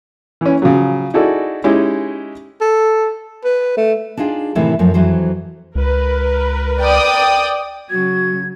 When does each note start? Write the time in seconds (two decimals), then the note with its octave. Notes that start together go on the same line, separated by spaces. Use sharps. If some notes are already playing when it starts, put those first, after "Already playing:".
0.41 E3 C#4
0.62 C#3 F3 F#3
1.14 D#4 E4 F#4 G#4 A4 D5
1.64 G#3 C#4 D#4 E4 G4
2.61 A4
3.44 B4
3.77 A3
4.17 D4 D#4 F4 G#4 G5
4.55 A2 C3 D#3 E3 A3 E4
4.79 F#2 F3 A3
4.94 F2 E3 F#3 C5
5.75 C#2 A#4 B4
6.81 D5 G5 D#6
7.90 C#3 F#3 F#4 G#6